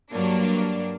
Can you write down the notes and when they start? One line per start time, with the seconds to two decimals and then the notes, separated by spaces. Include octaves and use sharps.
0.13 G2 F#3 A#3 D4